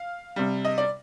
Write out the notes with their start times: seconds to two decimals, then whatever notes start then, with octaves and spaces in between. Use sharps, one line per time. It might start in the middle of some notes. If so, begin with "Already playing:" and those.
Already playing: F5
0.36 C3 G3
0.65 D#5
0.78 D5